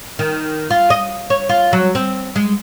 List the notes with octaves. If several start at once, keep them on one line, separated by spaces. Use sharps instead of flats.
D#3
F4
D#5
C#5
F4
F#3
C4
G#3